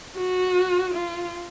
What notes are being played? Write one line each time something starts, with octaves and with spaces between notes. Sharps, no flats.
F#4
F4